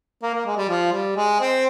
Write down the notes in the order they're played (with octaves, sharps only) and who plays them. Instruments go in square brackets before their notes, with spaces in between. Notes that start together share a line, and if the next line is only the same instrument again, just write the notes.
[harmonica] A#3
A#3
G#3
G3
F3
G3
G#3
C4